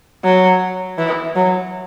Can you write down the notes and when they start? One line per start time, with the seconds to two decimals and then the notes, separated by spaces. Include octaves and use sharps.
0.24 F#3
0.98 E3
1.36 F#3